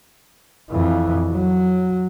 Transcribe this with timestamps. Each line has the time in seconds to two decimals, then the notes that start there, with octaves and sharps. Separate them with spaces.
0.70 F2 E3
1.31 F#3